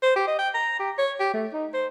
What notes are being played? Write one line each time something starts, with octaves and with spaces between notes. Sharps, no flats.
C5
G4
D#5
G5
A#5
G4
C#5
G4
A3
D#4
C5